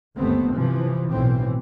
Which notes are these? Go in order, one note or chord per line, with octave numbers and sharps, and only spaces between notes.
G1 D#2 A3 B3 C4
C3 E3 F3
B1 A2 E3 C4